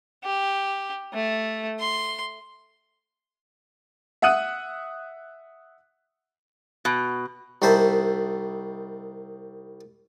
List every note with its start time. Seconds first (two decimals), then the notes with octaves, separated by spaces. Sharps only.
0.24 G4
1.14 A3
1.80 C6
4.22 E5 F#5 D#6 F#6 D#7
6.85 B2
7.62 C2 D#3 C5 E5 A5